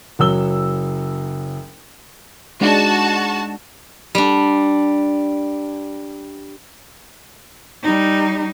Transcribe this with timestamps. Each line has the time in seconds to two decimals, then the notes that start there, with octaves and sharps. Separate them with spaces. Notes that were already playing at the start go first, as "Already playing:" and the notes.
0.19 F#1 F#3 E6 G7
2.61 G#3 D4 D#4 F#4 A5
4.15 G3 D4
7.83 G3 D#4